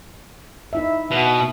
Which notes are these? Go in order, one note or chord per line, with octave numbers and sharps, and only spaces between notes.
D#4 E4 E5
B2